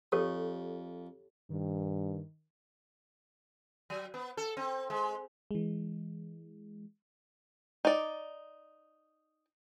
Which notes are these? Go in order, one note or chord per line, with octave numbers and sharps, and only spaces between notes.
F2 G4 A4 C#5
G2 D#3
F#3
B3
A4
C4
G#3
E3 G#3
D#4 D5